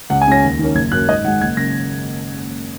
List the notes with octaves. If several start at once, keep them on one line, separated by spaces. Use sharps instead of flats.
C#2 F#5
G#5
C#3 G#3 C#4 A#6
D#2
D#3 A#3 C#4
F#1 G#6
F#2 F#3 A#3 C#4 F#6
G#2 D#5
D#3 G#3 F#5
F#1 G#6
F#2 C#3 A#3 A#6